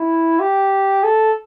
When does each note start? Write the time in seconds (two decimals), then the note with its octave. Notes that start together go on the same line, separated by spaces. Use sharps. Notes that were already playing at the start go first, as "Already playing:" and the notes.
Already playing: E4
0.39 G4
1.03 A4